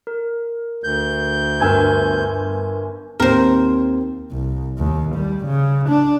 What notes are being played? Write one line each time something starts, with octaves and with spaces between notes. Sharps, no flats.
A#4
D2 G6
G1 A#4 G#5 E6 G#6
D#2 C4 A#4 C5
C2
D#2
G3
C#3
D4